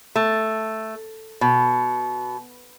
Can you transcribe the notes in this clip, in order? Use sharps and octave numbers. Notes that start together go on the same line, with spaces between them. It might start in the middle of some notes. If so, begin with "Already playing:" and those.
A3
B2